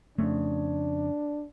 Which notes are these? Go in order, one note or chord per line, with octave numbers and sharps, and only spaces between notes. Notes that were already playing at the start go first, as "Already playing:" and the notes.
F2 C#3 A3 D4